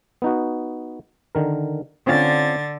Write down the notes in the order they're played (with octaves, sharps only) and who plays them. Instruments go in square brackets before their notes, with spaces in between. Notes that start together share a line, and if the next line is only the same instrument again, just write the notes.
[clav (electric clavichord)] B3 D#4 F#4
D3 D#3 A#4
[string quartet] D3 A6 [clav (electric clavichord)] C4 C#4 F4